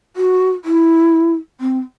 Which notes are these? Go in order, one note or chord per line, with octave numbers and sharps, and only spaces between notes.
F#4
E4
C4